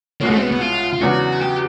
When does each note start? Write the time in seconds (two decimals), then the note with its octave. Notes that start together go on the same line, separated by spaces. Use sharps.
0.21 C2 B2 G#3 A#3 C#4
0.30 A3
0.37 C4
0.41 B3
0.51 B3
0.61 F4
0.93 F4
1.01 E2 C#3 F#3 B3 D4 F#4
1.42 G4